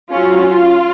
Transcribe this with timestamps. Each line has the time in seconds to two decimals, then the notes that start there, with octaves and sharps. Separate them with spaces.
0.11 F#3 C#4 F4
0.45 F4